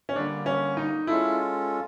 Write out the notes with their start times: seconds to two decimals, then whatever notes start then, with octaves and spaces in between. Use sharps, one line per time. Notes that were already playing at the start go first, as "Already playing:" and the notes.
0.09 C#4
0.16 D3 G3 A#3 D4
0.46 C#4
0.77 D#4
1.07 G#3 C#4 E4 F4 A4